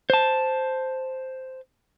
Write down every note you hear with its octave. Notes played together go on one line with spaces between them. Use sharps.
C5 A5